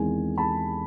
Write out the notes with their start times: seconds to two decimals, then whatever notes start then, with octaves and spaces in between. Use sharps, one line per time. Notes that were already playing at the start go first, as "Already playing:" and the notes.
Already playing: E2 C3 D#3 G#3 G#5
0.38 A5 B5